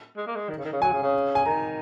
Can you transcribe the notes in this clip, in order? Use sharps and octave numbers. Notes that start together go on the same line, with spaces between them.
G#3
A#3
G#3
D#3
C#3
D#3
C#3
F#3 G#5
C#3
C#3
G#5
D#3 A#5